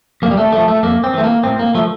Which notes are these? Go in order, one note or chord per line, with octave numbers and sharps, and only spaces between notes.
F2 A#3
G3
A3
D3 F3 A3
A3
F2 A#3
C4
E3 A3
A#3
A2 C4
A#3
F3 A3